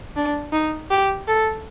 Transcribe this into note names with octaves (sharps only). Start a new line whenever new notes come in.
D4
D#4
G4
A4